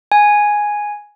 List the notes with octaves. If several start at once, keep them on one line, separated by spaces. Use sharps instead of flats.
G#5